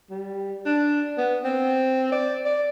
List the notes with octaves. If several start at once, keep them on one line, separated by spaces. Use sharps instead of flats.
G3
D4
B3
C4
D5
D5